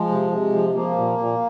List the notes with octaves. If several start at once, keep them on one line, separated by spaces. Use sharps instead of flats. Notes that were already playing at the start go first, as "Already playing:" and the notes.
Already playing: F3 G#3
C3
C3
F3
F3 A#3
A#2
A#2